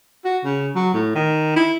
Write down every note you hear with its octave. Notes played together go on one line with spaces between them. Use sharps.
F#4
C#3
F#3
A2
D#3
E4